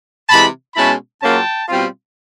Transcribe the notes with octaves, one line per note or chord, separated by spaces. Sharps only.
C3 E3 G#3 A5 B5
B2 G#3 C#4 E4 A5 B5
C#3 F#3 A#3 C#4 F4 G5 A5
B2 G3 C4 F4